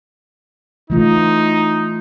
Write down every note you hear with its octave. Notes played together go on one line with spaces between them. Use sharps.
E3 A3 D#4 F4